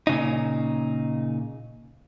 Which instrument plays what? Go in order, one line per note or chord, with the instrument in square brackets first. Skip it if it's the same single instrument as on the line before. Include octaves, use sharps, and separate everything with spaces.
[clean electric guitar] A#2 C#3 D#4